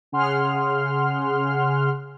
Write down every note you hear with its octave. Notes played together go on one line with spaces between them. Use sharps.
C#3 G#4 F#5 C6 F6